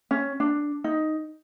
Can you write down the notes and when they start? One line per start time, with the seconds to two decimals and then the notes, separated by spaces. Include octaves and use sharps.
0.11 C#4
0.40 D4
0.84 D#4